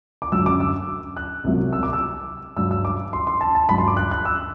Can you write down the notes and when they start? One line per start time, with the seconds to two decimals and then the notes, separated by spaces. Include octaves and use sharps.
0.22 D6
0.32 F#2 D3 F#3 E6
0.46 D6
0.60 E6
1.17 F#6
1.44 C2 C3 F#3
1.73 E6
1.83 D6
1.93 E6
2.56 G2 F#3 E6
2.71 E6
2.85 D6
3.13 C6
3.27 C6
3.41 A5
3.55 A5
3.69 G2 F#3 B5
3.78 C6
3.88 D6
3.97 F#6
4.11 F#6
4.25 E6